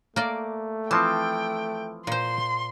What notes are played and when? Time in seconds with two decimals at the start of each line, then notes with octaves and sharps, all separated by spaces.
0.16 A3 A#3 D5
0.91 E3 F3 C4 G5 A5
2.07 A#2 C5 C6